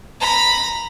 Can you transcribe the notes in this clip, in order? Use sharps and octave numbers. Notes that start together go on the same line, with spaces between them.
A#5 B5